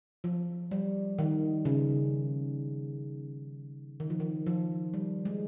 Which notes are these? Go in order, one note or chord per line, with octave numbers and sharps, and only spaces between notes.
F3
G3
D#3
C#3
D#3
F3
D#3
F3
G3
G#3